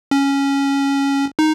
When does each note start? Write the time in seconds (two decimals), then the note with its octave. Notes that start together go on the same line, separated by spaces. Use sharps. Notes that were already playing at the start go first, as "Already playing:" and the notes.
0.11 C#4
1.39 D#4